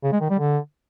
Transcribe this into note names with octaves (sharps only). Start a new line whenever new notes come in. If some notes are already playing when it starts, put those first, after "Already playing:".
C#3
G#3
D#3
G3
D3